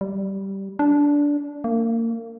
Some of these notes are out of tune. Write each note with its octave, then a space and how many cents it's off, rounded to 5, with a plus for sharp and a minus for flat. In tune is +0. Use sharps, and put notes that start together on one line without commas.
G3 -10
D4 -15
A#3 -30